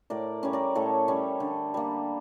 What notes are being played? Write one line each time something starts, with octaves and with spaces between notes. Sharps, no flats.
A2 A#4 D5
G3 C#4
A#4 D5
A2 A4 C#5
G3 C#4
D3
G3 A#3